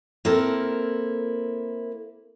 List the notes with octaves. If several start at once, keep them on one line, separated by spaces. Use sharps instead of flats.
A#3 C4 E4 A4 A#4